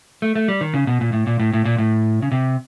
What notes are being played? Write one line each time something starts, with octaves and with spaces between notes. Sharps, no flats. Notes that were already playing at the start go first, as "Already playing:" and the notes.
A3
A3
G3
D#3
C#3
B2
A#2
A2
A#2
A2
A2
A#2
A2
C#3
C3